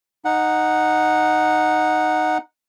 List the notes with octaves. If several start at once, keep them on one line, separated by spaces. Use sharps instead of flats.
D#4 F#5